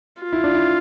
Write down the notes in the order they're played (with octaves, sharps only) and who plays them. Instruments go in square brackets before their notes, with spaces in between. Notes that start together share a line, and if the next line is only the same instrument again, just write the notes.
[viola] F4
[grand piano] E4
D4
E4